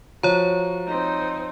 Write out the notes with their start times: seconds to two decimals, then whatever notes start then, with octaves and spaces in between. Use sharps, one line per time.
0.23 F3 F#4 C#5 A#5
0.87 C4 D#4